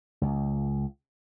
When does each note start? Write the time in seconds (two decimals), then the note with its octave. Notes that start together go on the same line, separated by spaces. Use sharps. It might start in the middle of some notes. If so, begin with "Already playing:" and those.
0.21 C#2